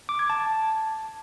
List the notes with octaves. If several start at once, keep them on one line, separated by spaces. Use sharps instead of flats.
D6
G#6
A5